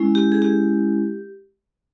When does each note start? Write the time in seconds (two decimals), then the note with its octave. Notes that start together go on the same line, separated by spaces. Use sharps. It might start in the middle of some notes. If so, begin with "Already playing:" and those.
Already playing: G#3 C#4 E4
0.15 G4
0.32 G#4
0.42 G4